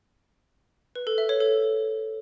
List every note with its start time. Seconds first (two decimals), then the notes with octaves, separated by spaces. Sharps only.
0.95 B4
1.07 A4
1.18 E5
1.29 C#5
1.40 A4